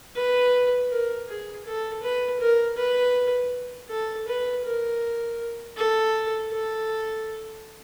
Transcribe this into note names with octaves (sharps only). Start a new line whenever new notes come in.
B4
A#4
G#4
A4
B4
A#4
B4
A4
B4
A#4
A4
A4